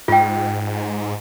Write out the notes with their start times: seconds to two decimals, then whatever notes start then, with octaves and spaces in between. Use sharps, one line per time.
0.08 G#2 F4 G5